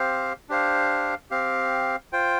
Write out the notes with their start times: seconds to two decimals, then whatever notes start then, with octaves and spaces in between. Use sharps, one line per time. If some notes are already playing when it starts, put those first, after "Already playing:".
Already playing: C4 G4 C5 F5
0.49 D4 G4 C5 F5
1.31 C4 G4 F5
2.13 F4 C5 G5